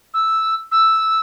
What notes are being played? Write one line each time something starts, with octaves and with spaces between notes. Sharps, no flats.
E6
E6